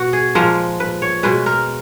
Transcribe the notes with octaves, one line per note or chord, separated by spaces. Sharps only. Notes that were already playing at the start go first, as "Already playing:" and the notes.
Already playing: B2 F#4
G#4
A#2 F3 G#3 A#4
B4
C#5
B2 G#3 B4
A#4